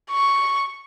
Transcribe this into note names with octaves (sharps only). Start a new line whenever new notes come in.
C#6